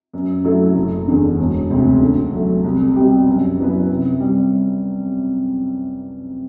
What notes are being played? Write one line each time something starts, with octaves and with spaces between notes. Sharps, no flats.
F#2
F#3 A3 E4 A4
F#1
E2 D3
E1
D2 C3
D3
F#3 A3
C2
B2 G3 C4 G4
F#2
F#3 B3 E4 B4
C3
G3 C4